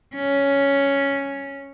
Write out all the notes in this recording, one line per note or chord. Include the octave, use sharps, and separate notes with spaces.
C#4